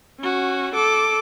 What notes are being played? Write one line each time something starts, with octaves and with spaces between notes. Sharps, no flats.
C#4 F#4
A4 D6